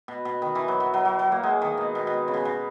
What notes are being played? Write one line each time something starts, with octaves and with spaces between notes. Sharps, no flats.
B2
B2
D#3
E3
F#3
F#3
F#3
F#3
F#3
A#3
G#3
D#3
B2
B2
B2
C#3
B2
B2